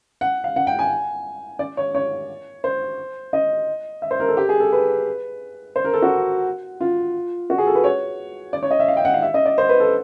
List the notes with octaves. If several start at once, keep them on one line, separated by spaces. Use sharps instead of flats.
F#5
F5
F#5
G5
G#5
D5
C#5
C#5
C5
D#5
E5
C5
A#4
A4
G4
G#4
A4
B4
C5
A#4
A4
F#4
F4
F#4
G#4
A4
B4
C#5
D5
C#5
D#5
E5
F5
G5
F#5
F5
E5
D#5
D5
C5
B4
A4